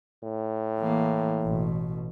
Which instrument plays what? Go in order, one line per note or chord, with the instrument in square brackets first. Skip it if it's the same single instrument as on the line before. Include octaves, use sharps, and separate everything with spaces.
[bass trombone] A2
[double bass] E3 A#3
A1 B2